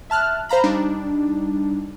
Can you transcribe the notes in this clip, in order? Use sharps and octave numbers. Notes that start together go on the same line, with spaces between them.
E5 A5 F6 F#6
C5 F5 A#5 B5
G3 D4 D#4